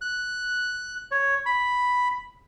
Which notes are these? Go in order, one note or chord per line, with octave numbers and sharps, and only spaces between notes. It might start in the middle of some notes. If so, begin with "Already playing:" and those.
F#6
C#5
B5